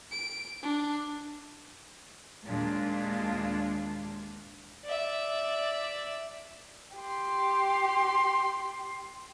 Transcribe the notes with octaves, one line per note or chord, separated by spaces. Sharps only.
D7
D4
D#2 A#2 G#3 D4 F4
D5 E5
G4 C6